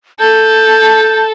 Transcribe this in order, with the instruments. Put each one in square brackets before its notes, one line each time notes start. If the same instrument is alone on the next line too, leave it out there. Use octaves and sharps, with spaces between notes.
[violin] A4 A5 [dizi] G6